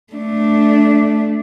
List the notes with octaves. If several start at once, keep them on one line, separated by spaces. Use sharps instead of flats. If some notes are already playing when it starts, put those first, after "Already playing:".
A3 D4